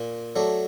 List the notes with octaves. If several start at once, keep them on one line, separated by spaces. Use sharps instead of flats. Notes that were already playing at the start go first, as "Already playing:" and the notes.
Already playing: A#2
F#3 A3 D4